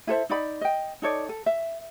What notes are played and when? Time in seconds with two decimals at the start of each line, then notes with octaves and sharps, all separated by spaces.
0.07 E4 A4 C5 E5
0.30 D#4 D5 B5
0.61 D#5 G5
1.02 D#4 A4 C#5 D5
1.29 A4
1.46 E5